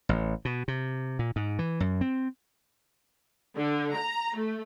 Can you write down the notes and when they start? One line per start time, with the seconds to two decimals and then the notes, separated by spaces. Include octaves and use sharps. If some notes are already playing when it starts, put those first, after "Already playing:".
0.09 A1
0.45 B2
0.68 C3
1.19 A#2
1.36 G#2
1.59 E3
1.80 F#2
2.01 C4
3.55 D3
3.94 A#5
4.33 A3